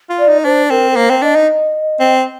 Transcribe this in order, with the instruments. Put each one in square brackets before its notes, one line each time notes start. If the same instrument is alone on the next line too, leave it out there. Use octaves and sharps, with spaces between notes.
[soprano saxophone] F4
[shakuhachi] D5
[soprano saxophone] D#4
[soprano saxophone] D4 [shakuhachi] C5
[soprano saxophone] C4 [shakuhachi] A#4
[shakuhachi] A#4
[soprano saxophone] A#3 [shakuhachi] C5
[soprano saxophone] C4
[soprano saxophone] D4 [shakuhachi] D#5
[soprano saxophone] D#4
C4